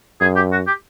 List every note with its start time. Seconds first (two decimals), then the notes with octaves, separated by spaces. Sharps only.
0.21 F#2 G#4
0.36 G4
0.52 F#4
0.67 G4